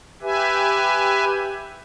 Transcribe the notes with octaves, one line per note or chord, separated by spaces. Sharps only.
G4 B4 E5 G#5